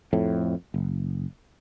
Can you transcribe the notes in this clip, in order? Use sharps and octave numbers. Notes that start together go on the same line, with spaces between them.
F2 A2
F#1